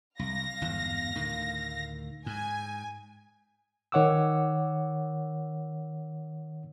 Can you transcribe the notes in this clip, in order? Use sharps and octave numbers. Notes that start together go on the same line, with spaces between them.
C2 F5 A#6
G1 E2 G#2
D2 A2 D#3
G#2 G#5
D#3 C#5 F#5 D6 E6